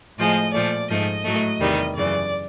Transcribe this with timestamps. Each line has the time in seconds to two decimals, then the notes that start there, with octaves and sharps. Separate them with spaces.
0.18 A2 F3 G#3 D#5
0.54 A#2 F3 A3 D5
0.89 G#2 F3 A3 D#5
1.24 A2 F#3 A3
1.60 E2 C3 D#3 G3
1.95 F#2 C#3 E3 D5